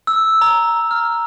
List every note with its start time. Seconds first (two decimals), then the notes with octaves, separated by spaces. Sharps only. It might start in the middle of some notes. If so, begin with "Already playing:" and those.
0.07 E6
0.41 A#5
0.91 F6